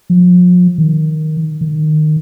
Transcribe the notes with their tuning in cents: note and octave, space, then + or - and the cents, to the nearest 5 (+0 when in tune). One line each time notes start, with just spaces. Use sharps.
F3 +40
D#3 +0
D#3 -20